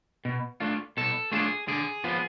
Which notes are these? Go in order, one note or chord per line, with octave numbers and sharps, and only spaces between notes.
B2
A3 D4 F4
B2 A4
A3 D4 F4 G#4
D3 G#4
F3 B3 F4